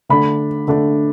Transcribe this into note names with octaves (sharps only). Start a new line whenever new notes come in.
D3 A3 D4 B5
D3 A3 D4